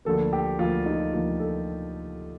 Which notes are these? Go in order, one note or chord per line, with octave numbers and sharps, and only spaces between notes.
D2 D3 F3 A#3 A4
G4
D2 D3 F3 A#3 F4
D#4
D2 D3 F3 A#3 F4
A4